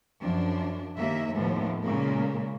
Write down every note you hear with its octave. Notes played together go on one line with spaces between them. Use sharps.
F#2 F3 D4
D#2 A#3 E5
D#2 A2 F3 B3
A#2 C#3 G#3 A#3